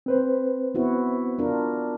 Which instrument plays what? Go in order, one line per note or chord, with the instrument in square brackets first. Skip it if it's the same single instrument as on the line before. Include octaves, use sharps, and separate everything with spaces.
[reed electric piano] C4 B4 C5
[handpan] B3 E4 F#4
D4 F4 A#4